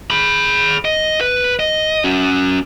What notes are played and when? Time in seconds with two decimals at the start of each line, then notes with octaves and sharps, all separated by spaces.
0.10 G#4 B5
0.85 D#5
1.21 B4
1.59 D#5
2.04 C#4 F#4